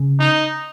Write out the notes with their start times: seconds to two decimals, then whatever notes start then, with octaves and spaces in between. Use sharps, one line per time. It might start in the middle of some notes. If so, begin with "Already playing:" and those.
Already playing: C#3
0.19 D#4